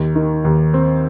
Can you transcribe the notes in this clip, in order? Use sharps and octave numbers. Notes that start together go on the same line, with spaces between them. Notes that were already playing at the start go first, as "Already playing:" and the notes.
Already playing: D#2
D#3
D#2
C4